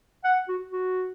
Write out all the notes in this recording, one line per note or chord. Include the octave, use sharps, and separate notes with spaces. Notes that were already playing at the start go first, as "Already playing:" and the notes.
F#5
F#4
F#4